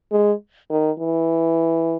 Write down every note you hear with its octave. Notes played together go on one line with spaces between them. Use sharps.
G#3
D#3
E3